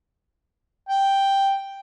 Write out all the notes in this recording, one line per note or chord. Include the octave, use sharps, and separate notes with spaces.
G5